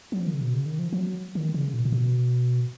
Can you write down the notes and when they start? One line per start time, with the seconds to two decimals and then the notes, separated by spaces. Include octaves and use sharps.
0.12 F#3
0.20 F3
0.27 D#3
0.34 C#3
0.41 B2
0.54 C#3
0.66 D#3
0.79 F3
0.93 F3
0.98 F#3
1.35 D#3
1.54 C#3
1.73 A#2
1.85 A#2
1.92 B2